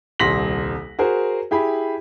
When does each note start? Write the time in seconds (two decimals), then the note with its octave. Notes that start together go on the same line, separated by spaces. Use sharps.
0.19 D#1 C2 C6 A#6 B6 F#7
0.99 F#4 G#4 A#4 C5
1.51 E4 G4 G#4 B5